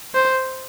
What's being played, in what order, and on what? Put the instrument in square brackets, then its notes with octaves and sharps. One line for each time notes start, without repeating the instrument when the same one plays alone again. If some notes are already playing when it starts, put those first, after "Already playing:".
[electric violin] C5